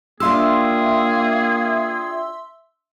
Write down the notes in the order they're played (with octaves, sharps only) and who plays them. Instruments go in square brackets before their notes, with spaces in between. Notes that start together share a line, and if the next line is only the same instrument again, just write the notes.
[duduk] A#3 [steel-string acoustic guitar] D4 F4 G4 [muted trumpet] G#4 [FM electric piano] E5 C6 E6